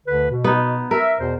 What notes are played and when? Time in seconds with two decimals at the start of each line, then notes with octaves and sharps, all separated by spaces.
0.07 D2 D3 B4
0.30 B2
0.44 B3 D#4
0.91 A#4 E5
1.19 E2 B2 C5